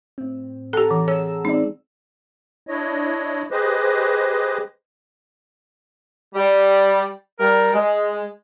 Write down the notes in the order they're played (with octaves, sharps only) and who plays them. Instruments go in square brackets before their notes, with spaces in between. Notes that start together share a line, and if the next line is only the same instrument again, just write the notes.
[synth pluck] A2 C4
[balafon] G4 A4 [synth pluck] F#5 A5 A#5
[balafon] E3
[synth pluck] G#4 E6 [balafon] C#5
[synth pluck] G#3 C4 D5 [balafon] D#4
[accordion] D4 E4 C#5 D#5
G4 G#4 B4 C5 D#5
[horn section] G3
G3 A#4
G#3